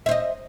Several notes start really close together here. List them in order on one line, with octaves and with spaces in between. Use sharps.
E5 C5 D#5